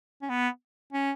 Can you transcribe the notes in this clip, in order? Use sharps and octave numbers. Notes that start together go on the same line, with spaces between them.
C#4
B3
C#4